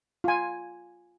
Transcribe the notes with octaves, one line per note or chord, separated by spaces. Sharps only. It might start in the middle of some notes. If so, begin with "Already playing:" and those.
F4 G#5